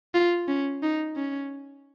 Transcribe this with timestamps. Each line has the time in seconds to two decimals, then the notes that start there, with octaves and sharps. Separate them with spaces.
0.14 F4
0.48 C#4
0.82 D#4
1.16 C#4